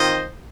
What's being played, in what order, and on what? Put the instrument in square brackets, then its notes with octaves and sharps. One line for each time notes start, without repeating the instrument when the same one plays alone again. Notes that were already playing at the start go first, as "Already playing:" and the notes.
Already playing: [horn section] D#3 C4 F4 C5 D#5